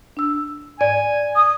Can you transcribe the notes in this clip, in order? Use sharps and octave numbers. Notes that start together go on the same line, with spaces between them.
D4 E6
G#2 D5 G#5 G#6
D#6